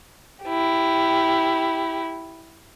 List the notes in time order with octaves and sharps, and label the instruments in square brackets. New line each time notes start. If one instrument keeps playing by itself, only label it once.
[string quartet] E4 G4